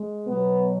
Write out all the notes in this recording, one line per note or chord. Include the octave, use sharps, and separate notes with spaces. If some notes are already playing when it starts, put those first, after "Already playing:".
Already playing: G#3
B2 F#3 B3